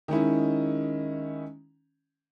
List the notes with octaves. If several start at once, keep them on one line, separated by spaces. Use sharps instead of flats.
D#3 G#3 C#4 E4